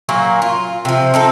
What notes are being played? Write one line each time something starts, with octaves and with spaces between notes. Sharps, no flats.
A#2 F#3 A#3
F4
C3 F3
C4 D#4 A4